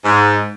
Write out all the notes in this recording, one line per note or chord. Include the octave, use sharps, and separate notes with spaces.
G#2